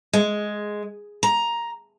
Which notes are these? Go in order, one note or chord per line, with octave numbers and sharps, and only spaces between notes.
G#3
A#5